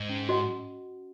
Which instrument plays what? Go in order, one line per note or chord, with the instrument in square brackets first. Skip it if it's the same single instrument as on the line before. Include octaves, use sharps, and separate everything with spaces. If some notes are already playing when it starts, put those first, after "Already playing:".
Already playing: [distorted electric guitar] G#2
[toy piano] C#4
F#4 D#5 F#5